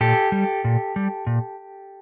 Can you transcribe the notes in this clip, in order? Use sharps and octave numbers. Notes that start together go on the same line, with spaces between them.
A#2 G4 A4
G3
A#2
G3
A#2